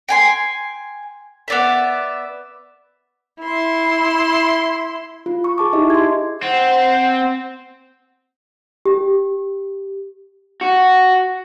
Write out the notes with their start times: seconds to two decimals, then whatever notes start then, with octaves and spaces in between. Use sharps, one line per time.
0.09 G5 G#5 C6
1.48 B3 D5 E5
3.41 E4 C6
5.26 F4
5.44 C#6
5.58 G#4 A5 D6
5.73 D#4 E4 G4 D#5 E5
5.90 C6 G#6
6.42 C4 C5 F#5
8.86 G4
10.61 F#4